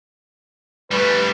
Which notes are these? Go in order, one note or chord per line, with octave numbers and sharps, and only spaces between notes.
G3 A3 B4